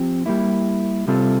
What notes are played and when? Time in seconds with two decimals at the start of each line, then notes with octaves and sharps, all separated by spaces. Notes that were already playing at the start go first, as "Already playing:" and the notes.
Already playing: F3 C4 G4
0.26 G3 A#3 E4
1.08 C3 G3 C4 F4 A4